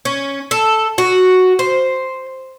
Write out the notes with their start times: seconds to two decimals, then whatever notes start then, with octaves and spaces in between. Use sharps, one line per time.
0.05 C#4
0.51 A4
0.98 F#4
1.59 C5